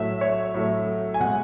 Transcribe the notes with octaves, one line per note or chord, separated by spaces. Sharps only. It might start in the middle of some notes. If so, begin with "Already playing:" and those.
Already playing: A2 F#3 A3 E5
C#5
A2 F#3 A3
G#5
B2 G#3 F#5